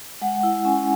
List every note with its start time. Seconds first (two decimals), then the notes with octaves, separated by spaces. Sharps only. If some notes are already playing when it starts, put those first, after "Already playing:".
0.22 G#3 F#5
0.43 E4
0.65 C#4 G#5